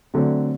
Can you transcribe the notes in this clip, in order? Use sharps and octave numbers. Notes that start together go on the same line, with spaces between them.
D3 F#3 A3 C4